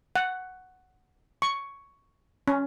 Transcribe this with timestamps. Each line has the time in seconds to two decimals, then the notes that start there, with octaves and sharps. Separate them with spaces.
0.16 F#5
1.42 C#6
2.48 C#4